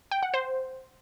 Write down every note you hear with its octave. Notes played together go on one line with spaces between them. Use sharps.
G5
F#5
C5